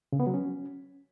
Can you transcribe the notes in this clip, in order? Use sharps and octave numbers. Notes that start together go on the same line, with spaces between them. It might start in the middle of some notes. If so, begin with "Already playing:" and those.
C#3
B3
F#3
C#4